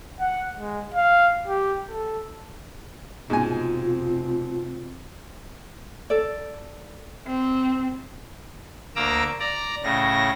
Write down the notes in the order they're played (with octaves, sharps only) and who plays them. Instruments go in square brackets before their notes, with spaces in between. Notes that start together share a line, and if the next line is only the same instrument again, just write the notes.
[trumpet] F#5
G#3
F5
G4
A4
[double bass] F1 C4 [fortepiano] G#2 G#5 [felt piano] B2 [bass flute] F4
[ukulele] A4 D5
[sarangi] C4
[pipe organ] D2 A#3 A#5 D6 E6
D5 A#5
A2 C#3 A#6